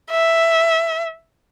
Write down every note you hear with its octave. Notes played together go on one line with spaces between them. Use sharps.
E5